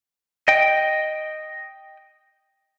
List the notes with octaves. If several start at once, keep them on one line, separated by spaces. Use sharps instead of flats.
D#5 G5